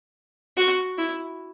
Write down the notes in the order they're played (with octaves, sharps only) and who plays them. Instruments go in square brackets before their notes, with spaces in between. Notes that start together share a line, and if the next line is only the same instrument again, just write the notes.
[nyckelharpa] F#4
E4